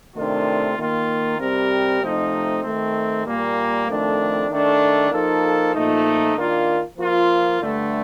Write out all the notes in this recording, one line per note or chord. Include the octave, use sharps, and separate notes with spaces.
C3 D#3 A3 D4 F4
D#3 A#3 F4
C3 G3 C4 G4 A#4
C3 F3 A3 D#4
D#3 A3 C4
A#2 G3 A#3
F2 D#3 A3 D4
D#3 A3 D4 A4
F3 A#3 D#4 A4
A#2 F3 A3 D#4
D#3 A#3 D4 F4
F3 A#3 F4
G2 D3 A3